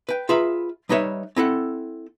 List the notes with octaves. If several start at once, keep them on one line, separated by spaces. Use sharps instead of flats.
B4 G5
F4 G#4 B4 E5 A#5 B5
G3 D#4 B4 C#5 E5
C4 E4 A4 F#5